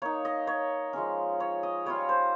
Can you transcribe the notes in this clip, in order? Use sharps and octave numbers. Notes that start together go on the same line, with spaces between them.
A#3 D#4 C#5
D#5
C#5
F3 G#3 C#4
C#5
D#5
G3 C#4 F4 C#5
C5